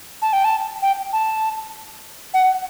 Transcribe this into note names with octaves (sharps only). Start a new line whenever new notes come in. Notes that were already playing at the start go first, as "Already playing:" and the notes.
A5
G5
A5
G5
A5
F#5